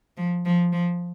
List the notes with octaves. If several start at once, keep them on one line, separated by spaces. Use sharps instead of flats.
F3
F3
F3